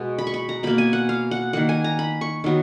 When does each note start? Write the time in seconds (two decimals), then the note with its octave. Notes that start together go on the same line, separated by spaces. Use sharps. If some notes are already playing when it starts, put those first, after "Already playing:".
Already playing: B2 G#3 B3
0.18 B5
0.27 C#6
0.34 B5
0.49 A#5
0.63 B2 A#3 B5
0.78 G#5
0.93 F#5
1.09 F5
1.31 F#5
1.53 D#3 A#3 F#5
1.69 G#5
1.84 A#5
1.99 B5
2.21 C#6
2.44 D#3 F#3 B3